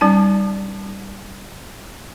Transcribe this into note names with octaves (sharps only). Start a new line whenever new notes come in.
G3 C#4 D#4 A5